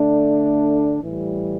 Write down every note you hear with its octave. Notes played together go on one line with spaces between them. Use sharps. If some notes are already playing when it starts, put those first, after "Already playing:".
Already playing: D3 A3 D4
A2 E3 G3